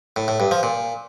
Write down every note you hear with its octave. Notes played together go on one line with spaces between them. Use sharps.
A2
A2
G2
F3
A#2